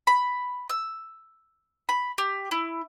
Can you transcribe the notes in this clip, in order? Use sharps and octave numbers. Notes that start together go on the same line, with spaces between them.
B5
E6
B5
G4
E4